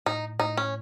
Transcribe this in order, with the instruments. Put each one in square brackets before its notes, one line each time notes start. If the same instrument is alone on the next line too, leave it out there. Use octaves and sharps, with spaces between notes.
[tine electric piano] A2 [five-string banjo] D#4
[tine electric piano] A2 [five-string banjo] D#4
[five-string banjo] C#4